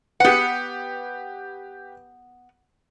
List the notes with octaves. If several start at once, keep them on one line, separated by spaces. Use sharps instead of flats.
B3 G4 B4 F#5